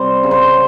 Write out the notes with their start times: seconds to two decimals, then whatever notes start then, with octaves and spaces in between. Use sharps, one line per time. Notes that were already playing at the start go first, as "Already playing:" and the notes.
Already playing: C3 G3 C5
0.23 C#3
0.31 C5